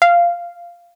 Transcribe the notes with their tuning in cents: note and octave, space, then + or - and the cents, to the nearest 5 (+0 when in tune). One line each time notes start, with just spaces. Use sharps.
F5 -10